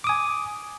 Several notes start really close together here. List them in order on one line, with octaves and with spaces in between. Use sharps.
D6 D#6 G#5